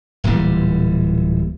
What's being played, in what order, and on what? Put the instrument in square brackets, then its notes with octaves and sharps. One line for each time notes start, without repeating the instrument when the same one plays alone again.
[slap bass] D1 A#2 E3 G3